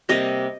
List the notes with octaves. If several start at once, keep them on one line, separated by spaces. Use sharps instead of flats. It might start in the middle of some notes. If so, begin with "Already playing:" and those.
C3 G3 A#3 D#5